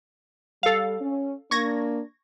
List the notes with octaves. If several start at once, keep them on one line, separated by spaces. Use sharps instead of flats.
G3 A4 F5
C#4
A#3 D4 C#6 G#6 A#6